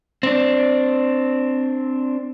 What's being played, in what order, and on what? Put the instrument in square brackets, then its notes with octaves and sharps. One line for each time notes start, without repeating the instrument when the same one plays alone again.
[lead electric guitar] C4 D4